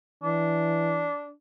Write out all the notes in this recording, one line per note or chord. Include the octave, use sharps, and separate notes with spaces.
E3 D4